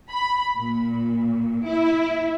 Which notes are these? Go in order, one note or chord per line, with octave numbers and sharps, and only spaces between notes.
B5
A#2
E4